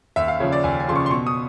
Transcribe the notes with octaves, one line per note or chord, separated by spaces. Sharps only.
D#2 E5
F5
C#3 F3 C#5
D5
D#2 G#5
G#5
C#3 F3 C6
C#6
C6
B2 C#6
D#6